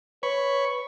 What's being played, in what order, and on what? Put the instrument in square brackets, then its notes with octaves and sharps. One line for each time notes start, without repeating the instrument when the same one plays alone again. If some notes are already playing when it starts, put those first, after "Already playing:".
[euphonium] B4 [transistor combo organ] C#5 B5 C#6